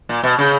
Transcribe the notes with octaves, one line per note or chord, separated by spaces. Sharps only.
A#2
B2
C#3